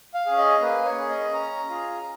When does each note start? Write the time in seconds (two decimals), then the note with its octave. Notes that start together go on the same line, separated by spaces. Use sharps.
0.14 F5
0.26 C#4 G#4
0.38 D#5
0.61 A#3 B4
0.85 C#5
0.97 C#4 G#4
1.09 D#5
1.33 C#4 A#5
1.69 F4 G#4